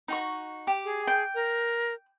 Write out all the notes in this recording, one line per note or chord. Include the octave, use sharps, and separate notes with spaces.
D#4 F#4 C#6
G4
G#4
G5
A#4